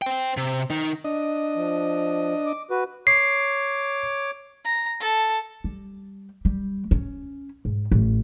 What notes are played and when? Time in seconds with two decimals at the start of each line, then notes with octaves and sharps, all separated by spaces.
0.02 C5 G5
0.37 C3
0.70 D#3 D#4
1.05 D4 D#5
1.55 F3
2.46 D6
2.70 F#4 B4
3.07 C#5 D6 C7
4.65 A#5
5.00 A4
5.64 G3
6.45 G3
6.91 C#4
7.65 G#2
7.91 A1